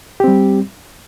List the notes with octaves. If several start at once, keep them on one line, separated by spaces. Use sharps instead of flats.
G3 C4 G4